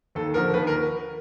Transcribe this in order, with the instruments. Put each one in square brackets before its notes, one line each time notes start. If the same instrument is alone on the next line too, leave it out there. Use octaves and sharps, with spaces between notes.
[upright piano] D#2 A4
D3 F3 A#4
D#2 B4
A#4